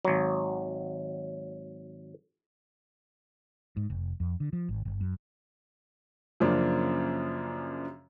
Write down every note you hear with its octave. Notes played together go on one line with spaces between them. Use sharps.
G#1 F#3
G#2
F1
F2
D3
F3
G#1
G1
F#2
F#2 C#3 F3 A#3 D4